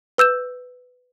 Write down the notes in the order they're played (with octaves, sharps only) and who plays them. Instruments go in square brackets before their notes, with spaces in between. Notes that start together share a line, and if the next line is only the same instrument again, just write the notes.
[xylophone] B4 E6 G6 E7